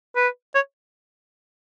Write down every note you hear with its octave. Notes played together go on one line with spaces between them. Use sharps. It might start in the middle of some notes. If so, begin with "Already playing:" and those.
B4
C#5